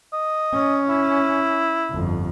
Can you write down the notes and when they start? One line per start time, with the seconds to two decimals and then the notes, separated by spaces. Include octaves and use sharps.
0.13 D#5
0.54 C#4
0.89 E4
1.91 G1 F2